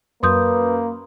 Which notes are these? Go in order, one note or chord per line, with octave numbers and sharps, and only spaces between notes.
F#2 A#3 B4 C6 D#6 G6